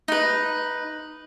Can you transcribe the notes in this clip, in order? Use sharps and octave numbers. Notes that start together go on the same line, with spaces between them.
D#4 B4